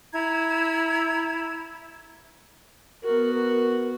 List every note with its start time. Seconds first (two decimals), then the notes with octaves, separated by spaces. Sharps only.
0.12 E4 A#5 G#6
3.03 B3 F#4 A#4
3.33 A#4